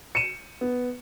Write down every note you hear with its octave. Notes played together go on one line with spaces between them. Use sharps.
C#7 D#7 E7
B3